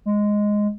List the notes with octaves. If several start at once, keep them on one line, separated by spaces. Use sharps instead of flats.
G#3